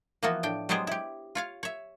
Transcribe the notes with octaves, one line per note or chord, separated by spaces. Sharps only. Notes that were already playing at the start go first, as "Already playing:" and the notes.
E3 F3 A#3 B3 F#4
A2 D4 G5
F#3 G#3 B3 G4 G#4 C5
E4 G4
F4 C#5 F5
C#5 E5